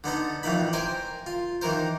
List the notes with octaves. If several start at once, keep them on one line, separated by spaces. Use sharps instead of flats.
D3 B3 D#4 A4
F2 A2 E3 A#3 D#4 B5
A#4 C5 G5 G#5
F4
D#3 E3 A#3 A#4 C5